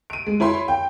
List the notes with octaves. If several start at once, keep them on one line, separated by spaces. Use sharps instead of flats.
D7 D#7
G#3
E4 C#5 B5 C6
G5